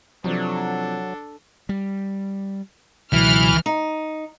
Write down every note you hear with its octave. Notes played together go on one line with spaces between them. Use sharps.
C3 F3 F#3 D4 A4 D5
G3
C#2 B2 E3 F#3 F6
D#4